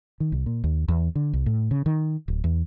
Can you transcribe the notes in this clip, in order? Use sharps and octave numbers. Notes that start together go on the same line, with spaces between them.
D#3
C2
A#2
D#2
E2
D3
C2
A2
C#3
D#3
D1
E2